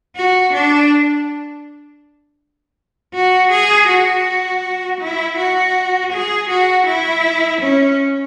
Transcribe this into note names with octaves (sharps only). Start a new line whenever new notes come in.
F#4
D4
F#4
G#4
F#4
E4
F#4
G#4
F#4
E4
C#4